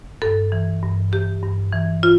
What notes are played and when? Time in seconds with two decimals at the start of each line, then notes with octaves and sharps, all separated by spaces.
0.22 G2 A4
0.52 E3
0.83 G2
1.12 E3 G4
1.43 G2
1.72 E3
2.03 F4